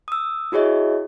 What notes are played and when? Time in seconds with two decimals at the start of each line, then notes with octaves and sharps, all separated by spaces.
0.08 D#6 E6
0.52 E4 F#4 G#4 C#5 D#5 E5